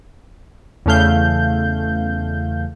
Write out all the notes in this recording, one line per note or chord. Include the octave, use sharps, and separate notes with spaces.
E2 C#3 A3 F5 G6